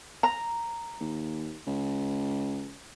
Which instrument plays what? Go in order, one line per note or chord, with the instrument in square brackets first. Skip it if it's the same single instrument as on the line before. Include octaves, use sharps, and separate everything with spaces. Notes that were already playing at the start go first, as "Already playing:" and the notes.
[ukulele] A#5
[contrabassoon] D#2
C#2